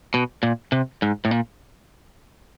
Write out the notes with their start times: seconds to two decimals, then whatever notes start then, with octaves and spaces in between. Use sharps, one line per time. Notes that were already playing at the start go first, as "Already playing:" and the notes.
0.14 B2
0.43 A#2
0.72 C3
1.02 G#2
1.25 A2
1.31 A#2